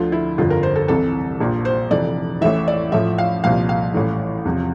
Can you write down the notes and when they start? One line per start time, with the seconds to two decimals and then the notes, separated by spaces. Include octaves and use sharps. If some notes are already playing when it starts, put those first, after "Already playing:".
Already playing: D2 D3 F3 F4
0.12 E4
0.38 G1 F2 D3 F3 F4
0.50 A#4
0.63 C5
0.76 A4
0.88 C2 C3 E3 A4
1.40 A#1 A#2 F3
1.65 C5
1.91 F1 F2 E3 D5
2.41 A1 A2 E3 E5
2.68 D5
2.92 A1 A2 F3 E5
3.18 F5
3.44 C2 A#2 F3 F5
3.69 F5
3.94 A1 A2 E3
4.45 E2 C3 F3